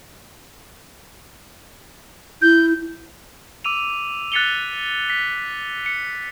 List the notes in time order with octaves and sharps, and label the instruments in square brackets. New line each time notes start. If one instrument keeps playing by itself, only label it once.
[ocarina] E4 [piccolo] G6
[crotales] D6 E6 D#7 F7
F#6 A6 B6 C#7 F7 G7
B6
C#7